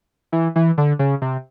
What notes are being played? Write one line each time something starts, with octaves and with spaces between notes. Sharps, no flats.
E3
E3
D3
C#3
C3